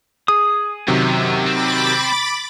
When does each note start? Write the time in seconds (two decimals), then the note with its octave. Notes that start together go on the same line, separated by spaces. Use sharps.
0.28 G#4 D#6
0.88 F#2 C3 D#3 F#3
1.47 C4 B5 D6 A6